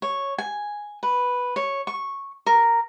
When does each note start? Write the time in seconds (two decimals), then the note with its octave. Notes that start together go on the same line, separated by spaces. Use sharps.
0.02 C#5
0.38 G#5
1.03 B4
1.56 C#5
1.87 C#6
2.46 A#4